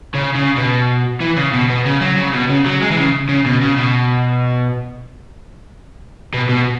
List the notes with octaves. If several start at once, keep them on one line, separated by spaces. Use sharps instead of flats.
C#3
C#3
B2
E3
C#3
B2
B2
C#3
F#3
C#3
B2
C#3
F#3
G#3
E3
C#3
C#3
B2
C#3
B2
B2
B2